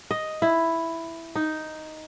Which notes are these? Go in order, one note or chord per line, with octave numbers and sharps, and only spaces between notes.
D#5
E4
D#4